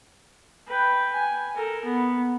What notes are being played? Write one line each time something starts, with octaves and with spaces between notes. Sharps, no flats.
B4 G5
G#5
A4 A#4
B3